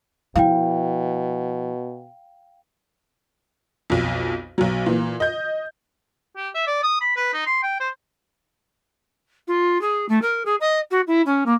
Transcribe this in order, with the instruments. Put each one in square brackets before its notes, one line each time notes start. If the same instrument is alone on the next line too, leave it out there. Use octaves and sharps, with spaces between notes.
[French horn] B2 [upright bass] F3 E4 [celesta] F5 G5
[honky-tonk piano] B1 F2
B1 F#3
A#2 E3
D#5 G6
[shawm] G4
E5
D5
D#6
B5
B4
D#4
C6
G5
C5
[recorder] F4
G#4
A3
A#4
G#4
D#5
F#4
E4
C#4
A#3